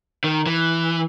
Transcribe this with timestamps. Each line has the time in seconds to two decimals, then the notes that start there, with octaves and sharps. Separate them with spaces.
0.24 D#3
0.46 E3